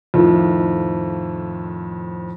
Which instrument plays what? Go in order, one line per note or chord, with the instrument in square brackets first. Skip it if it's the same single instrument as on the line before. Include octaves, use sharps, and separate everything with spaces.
[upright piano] F2 A2 D#3 F3